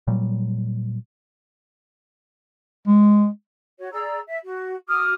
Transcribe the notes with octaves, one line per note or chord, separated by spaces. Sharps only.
A#2 F#3 G3
G#3
F#4 C#5
G#4 D5 A#5 E6
E5
F#4
F#4 D6 D#6 F6